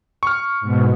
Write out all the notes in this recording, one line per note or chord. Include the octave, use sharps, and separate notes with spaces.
C#6 F6
G#2 B2